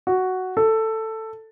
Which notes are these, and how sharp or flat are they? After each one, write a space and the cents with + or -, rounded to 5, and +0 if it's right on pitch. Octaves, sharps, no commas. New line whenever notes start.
F#4 +5
A4 +10